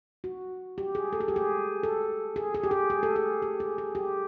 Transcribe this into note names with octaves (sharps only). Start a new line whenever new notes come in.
F#4
G4
G#4
A4
G#4
G4
G#4
A4
G#4
G#4
G4
G#4
G#4
A4
G#4
G4
G#4
G#4
G4